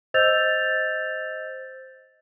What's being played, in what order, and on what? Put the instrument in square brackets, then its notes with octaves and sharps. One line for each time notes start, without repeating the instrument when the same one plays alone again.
[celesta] C5 D#5 E6 G6 A6 F7